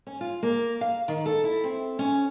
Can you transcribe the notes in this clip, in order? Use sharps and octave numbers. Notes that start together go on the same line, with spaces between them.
C#4
F4
A#3
F5
D#3
A4
E4
C4
C#4